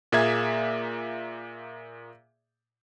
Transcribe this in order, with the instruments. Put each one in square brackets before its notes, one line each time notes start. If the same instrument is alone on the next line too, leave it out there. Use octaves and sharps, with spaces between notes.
[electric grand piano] A#2 A#3 G#4 E5 G#6